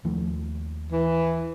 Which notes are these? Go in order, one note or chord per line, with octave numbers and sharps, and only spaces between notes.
D#2 F3 A3
E3